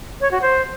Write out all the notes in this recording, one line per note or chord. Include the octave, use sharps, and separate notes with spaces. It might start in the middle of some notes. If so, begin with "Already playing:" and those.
C#5
F#4
C5